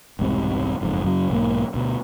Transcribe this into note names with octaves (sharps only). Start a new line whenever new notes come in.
E1 C2 G#2 C3
F#1 F2 G#2
F#2 C#3 F#3
B1 G#2 F#3 A#3
D2 B2